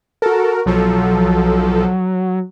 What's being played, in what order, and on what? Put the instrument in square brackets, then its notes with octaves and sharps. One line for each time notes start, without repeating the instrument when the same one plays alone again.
[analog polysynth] F#4 A#4 [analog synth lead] A4
[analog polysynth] B1 F3 A4 [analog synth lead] F#3